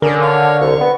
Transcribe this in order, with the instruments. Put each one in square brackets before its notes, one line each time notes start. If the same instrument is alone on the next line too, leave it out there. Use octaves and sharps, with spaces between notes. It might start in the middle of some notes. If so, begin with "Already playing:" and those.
[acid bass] D3 [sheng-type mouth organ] C#4 G#4 D5 [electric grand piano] A#4
[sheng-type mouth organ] C#5 F5
[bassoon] C2 [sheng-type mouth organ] C#6
[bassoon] B3